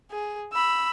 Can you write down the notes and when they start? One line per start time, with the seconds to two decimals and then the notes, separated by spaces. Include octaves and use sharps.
0.11 G#4
0.53 B5 E6